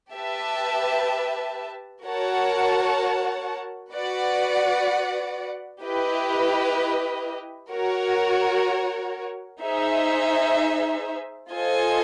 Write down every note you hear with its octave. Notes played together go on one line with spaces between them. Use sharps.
G4 B4 E5 A5
F#4 A#4 C#5 F#5 A5
F#4 B4 D5 F#5
E4 G4 B4 D#5
F#4 A#4 C#5
D#4 G#4 C5 E5
F4 A4 C5 D#5 G#5